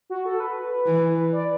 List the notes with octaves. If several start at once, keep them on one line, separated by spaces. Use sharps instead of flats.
F#4
A4
B4
E3
D5